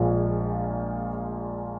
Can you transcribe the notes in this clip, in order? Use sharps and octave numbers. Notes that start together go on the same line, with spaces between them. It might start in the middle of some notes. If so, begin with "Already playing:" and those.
Already playing: A#1 A#2 F3 G#3